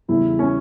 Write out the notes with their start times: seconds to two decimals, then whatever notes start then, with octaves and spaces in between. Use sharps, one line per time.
0.08 E2 C#3 G3 E4
0.39 C#4